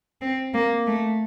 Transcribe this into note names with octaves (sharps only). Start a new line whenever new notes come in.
C4
A#3
A3